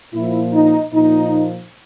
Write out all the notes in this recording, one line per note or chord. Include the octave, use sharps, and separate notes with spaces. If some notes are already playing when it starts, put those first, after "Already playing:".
A#2 F3 E4
D#4
A#2 F3 D#4